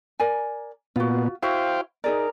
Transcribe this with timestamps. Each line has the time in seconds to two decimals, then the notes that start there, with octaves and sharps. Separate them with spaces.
0.20 A#4 D5 G#5
0.96 A#2 B3 F4 F#4
1.43 E4 F#4 C5 F5 G5
2.04 D#4 G#4 A#4 D5